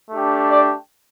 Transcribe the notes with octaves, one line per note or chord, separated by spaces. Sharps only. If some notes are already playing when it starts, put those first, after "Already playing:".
A3 D4 G4
D5